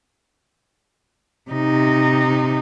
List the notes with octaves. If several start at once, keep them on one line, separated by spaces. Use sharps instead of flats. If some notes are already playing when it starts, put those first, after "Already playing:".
C3 D#4